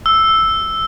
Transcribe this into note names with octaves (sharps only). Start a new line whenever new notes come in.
E6